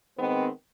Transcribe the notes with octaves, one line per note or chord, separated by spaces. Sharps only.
D#3 G#3 B3 C4